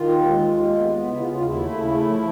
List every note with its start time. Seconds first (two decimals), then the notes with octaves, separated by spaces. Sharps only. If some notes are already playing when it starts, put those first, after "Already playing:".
Already playing: D#3 F4
0.09 D#2
0.26 G#3
0.42 D#2
0.59 G#3
0.75 B3
0.91 B3
1.08 C#3 E4
1.20 F4
1.25 C#3
1.32 F4
1.41 D#2 E4
1.57 A3
1.74 C#3
1.90 A3
2.07 F3